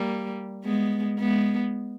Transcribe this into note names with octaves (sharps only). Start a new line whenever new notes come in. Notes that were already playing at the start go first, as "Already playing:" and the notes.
Already playing: G3 A#3
G#3 B3
G#3 B3